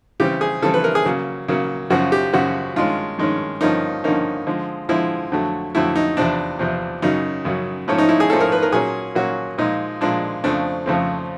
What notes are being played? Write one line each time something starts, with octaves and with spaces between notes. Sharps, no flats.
C#3 E3 G3 C4 G4
G#4
C#3 E3 G3 C4 A4
B4
A#4
G#4
C#3 F#3 A#3
C#3 F#3 A#3
F#2 C#3 F3 F#4
G4
F#2 C#3 F3 F#4
G2 D#3 G#3 C#4 F4
G2 D#3 G#3 C#4
G2 D3 F3 A#3 C#4 D#4
G2 D3 F3 A#3 C#4 D#4
D3 F3 G#3
D3 F3 G#3 E4
F2 D3 F#3 A3
F2 D3 F#3 A3 E4
D#4
E2 C3 F3 D4
E2 C3 F3
F#2 C#3 F#3 D#4
F#2 C#3 F#3
G#2 F3 A3 C#4
D#4
E4
G#4
G#2 F3 A3 C#4 A4
A#4
B4
A#4
A#2 F#3 A#3 C#4 G#4
A#2 F#3 A#3 C#4 F#4
A#2 F3 G#3 D#4
A#2 F3 G#3 D4
F2 C#3 F3 A3 C4 D4
F2 C#3 F3 A3 C4